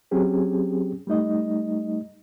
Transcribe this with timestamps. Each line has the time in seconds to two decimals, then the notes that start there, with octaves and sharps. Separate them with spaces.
0.11 F#3 C4 C#4 G4 G#4
1.07 G3 A3 D#4 D#5